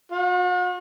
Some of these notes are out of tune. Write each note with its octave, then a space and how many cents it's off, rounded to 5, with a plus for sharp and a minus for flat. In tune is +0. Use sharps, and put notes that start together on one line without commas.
F#4 -45